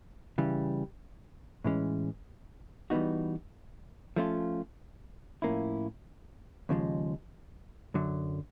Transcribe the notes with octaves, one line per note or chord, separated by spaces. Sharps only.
C#3 E3 G3
A2 E3 G#3 C#4
E3 G3 B3 D#4 F#4
F3 A3 C#4 F4
A2 F3 A#3 C#4 E4
D#2 C#3 F3 G#3
F#2 D3 F#3